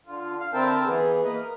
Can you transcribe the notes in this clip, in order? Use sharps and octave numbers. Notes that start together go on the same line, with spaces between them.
D3 F4
F5
D3 C4 E4 A#4 G5 A5
E3 B3 G#4
A#3 B4 D#5
A#4